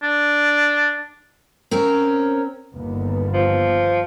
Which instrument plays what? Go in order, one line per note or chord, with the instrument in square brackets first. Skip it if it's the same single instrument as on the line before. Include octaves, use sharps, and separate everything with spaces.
[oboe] D4
[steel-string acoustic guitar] C4 C#4 A#4
[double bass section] G1 D#2 B3
[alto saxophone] F3